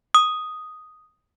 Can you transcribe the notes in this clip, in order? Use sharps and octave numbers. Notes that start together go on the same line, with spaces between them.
D#6